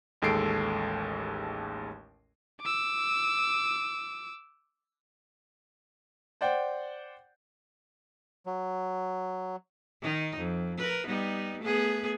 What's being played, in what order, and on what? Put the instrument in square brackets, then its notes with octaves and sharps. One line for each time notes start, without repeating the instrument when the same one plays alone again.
[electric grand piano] A1 D#2 G#3 A4 C7 D7
[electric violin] D6 E6
[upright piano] C5 D5 F#5 G5
[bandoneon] F#3
[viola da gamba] D#3 D#4
F2
A#4 B4
G3 B3 D#4
A3 B3 G#4